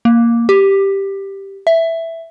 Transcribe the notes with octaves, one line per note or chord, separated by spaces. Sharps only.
A#3
G4
E5